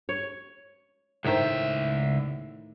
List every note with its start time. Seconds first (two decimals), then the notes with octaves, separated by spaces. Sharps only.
0.09 C#5
1.24 C#2 A2 D#3 C5 E5